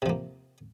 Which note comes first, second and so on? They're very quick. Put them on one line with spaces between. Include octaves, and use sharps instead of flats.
C3 F3 A#3